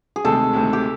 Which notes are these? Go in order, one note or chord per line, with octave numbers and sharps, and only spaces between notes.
G#4
D2 C3 D#3 G#3 C4 A4
D2 C3 D#3 G#3 C4
G4